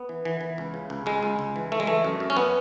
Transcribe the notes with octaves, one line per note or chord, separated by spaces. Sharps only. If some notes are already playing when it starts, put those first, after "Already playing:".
Already playing: B3
E3
E3
E3
C#2
C#3
C#2
C#2 G#3
C#2
C#2
E3
E3 A3
G#3
E3 A3
F#2
F#2
C#4
B3